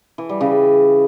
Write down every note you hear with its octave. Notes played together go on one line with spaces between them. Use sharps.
E3
G3
C#3